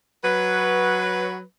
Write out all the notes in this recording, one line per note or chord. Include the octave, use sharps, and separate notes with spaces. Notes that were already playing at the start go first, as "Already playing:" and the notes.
F#3 B4